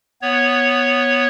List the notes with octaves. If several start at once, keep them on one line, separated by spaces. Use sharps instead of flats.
B3 C#5